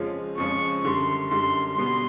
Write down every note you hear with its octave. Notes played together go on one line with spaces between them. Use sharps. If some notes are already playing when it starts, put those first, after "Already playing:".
Already playing: F2 C#3 F3 G#3 C#4
F2 C#3 F3 G#3 C#4 C#6
F#2 D3 G3 C6
F#2 D3 G3 C6
B2 G3 B3 C6